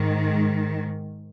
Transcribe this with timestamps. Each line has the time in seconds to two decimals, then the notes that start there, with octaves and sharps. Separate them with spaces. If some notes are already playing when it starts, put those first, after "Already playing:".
Already playing: G#2 D#3
0.24 G#3